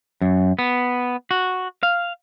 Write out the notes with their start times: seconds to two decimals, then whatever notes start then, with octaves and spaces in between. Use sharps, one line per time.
0.21 F#2
0.59 B3
1.31 F#4
1.83 F5